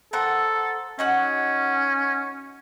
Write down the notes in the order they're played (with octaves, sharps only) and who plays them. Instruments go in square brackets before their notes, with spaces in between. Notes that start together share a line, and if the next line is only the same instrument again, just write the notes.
[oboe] A4 [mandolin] A#4 C5 F#5
[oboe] C#4 [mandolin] D#4 F#4 F#5